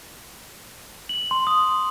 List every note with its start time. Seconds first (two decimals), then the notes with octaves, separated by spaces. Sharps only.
1.09 F#7
1.31 C6
1.47 D#6